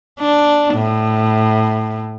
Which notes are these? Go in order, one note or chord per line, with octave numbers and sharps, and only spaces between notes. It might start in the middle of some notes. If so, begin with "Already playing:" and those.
D4
A2